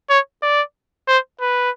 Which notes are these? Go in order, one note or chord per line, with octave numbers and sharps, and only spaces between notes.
C#5
D5
C5
B4